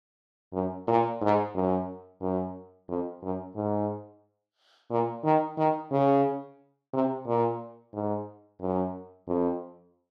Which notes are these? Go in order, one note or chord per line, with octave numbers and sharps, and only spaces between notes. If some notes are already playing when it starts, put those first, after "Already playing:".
F#2
A#2
G#2
F#2
F#2
F2
F#2
G#2
A#2
D#3
D#3
C#3
C3
A#2
G#2
F#2
F2